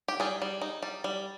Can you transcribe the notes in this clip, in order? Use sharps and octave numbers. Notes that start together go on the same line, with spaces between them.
G4
G3 G#4
G3
D#4
G3
G3